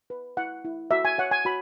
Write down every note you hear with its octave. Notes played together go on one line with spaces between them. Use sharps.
B4
E4 F#5
E4
F#4 E5
G#5
C#5 F#5
G#5
F#4 B5